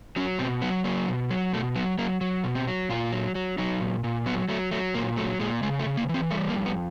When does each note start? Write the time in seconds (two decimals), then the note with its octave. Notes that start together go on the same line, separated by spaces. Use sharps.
0.16 F#3 C#4
0.39 B2 C4
0.62 F#3 B3
0.84 F#3 A#3
1.08 B2
1.31 F#3
1.53 B2 A3
1.75 F#3 B3
1.98 F#3 A#3
2.21 F#3
2.44 B2
2.55 C4
2.68 F#3
2.89 A#2 F4
3.12 F#3
3.35 F#3
3.58 F#3 D#4
3.80 A#2
4.04 A#2
4.26 F#3 B3
4.49 F#3 A3
4.71 F#3 A3
4.94 A#2 A#3
5.17 F#3 A3
5.40 A#2 G#3
5.62 C#3 G#3
5.80 A3
5.86 C#3
5.97 A#3
6.09 E3 C4
6.31 G3 A3
6.49 A#3
6.54 F2
6.66 B3